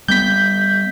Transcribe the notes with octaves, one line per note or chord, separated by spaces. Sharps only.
G3 A#3 B3 G6 B6